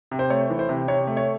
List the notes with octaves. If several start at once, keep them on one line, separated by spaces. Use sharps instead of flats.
C3
C5
A3 C#5
E3
C5
C3
C3 C#5
A3
C#5